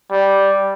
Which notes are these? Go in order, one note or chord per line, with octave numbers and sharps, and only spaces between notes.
G3